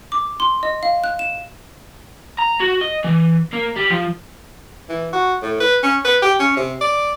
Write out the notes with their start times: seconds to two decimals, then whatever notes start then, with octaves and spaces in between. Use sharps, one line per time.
0.12 D6
0.40 C6
0.63 D#5
0.83 F5
1.04 F#6
1.19 E7
2.38 A#5
2.60 F#4
2.81 D#5
3.04 E3
3.53 A#3
3.76 G3
3.90 F3
4.89 E3
5.13 F#4
5.42 A2
5.60 B4
5.83 C#4
6.05 B4
6.22 G4
6.40 C#4
6.56 C3
6.81 D5